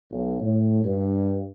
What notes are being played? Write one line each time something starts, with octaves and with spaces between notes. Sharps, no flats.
B1
A2
G2